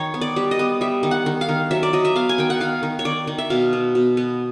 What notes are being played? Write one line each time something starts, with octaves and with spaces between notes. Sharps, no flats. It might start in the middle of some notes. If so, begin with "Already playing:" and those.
Already playing: D#3 C#5
B3
D5
G3
D#5
B3
G3 E5
D#3
F#5
D#3
F5
D#3
F#3 E5
D5
F#3 D#5
E5
B3 F5
G#5
D#3 G5
F#5
D#3 F5
D#3
C#5
D#3 D5
D#3
E5
B2 F5
B3
B2
B3